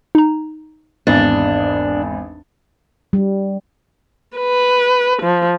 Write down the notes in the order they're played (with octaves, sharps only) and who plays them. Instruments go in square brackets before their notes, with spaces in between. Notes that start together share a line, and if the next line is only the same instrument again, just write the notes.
[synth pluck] D#4 A#5
[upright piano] G#1 E2 A6 [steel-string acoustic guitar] D4
[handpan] G3
[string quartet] B4
F3